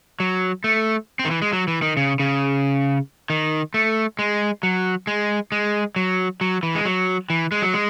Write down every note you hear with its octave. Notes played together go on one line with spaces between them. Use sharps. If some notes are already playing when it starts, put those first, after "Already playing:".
F#3
A3
C4
D#3
E3
G#3
F#3
E3
D#3
C#3
C#3
D#3
A3
G#3
F#3
G#3
G#3
F#3
F#3
E3
G#3
F#3
E3
G#3
F#3
G#3